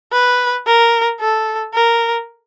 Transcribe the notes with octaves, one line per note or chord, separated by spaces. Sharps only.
B4
A#4
A4
A#4